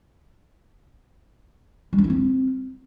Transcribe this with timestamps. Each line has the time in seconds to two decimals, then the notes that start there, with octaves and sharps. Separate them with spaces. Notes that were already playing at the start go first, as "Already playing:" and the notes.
1.93 G3
1.98 D4
2.04 E4
2.10 C4